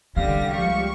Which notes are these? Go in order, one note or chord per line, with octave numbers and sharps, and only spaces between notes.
C2 D3 G3 A#3 F5 A#6
C#2 F3 G3 F5 C#6